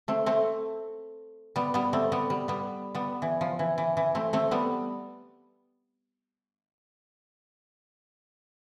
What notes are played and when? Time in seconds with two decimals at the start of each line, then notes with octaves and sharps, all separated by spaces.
0.08 A3 C4
0.26 A3 C4
1.56 G3 B3
1.74 G3 B3
1.93 A3 C4
2.12 G3 B3
2.30 G3
2.48 G3 B3
2.95 G3 B3
3.22 E3
3.41 F3
3.59 E3
3.78 E3
3.97 E3
4.15 A3 C4
4.33 A3 C4
4.51 G3 B3